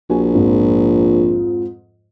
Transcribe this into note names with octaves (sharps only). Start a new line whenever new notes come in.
A#1 F#4 G#5
F2 G#2 F3